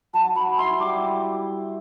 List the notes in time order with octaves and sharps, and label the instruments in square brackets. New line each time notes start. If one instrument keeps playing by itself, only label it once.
[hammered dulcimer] F#3 [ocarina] A5
[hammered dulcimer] F#3 [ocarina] B5
[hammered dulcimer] E4 [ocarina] C6
[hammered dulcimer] G3 [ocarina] D6